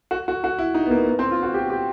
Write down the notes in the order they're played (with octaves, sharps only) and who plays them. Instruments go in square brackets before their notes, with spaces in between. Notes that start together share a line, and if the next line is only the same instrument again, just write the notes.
[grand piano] F#4
F#4
F#4
E4
D#4
B3
A#3
B3
C4
F4
F#4
G4
G4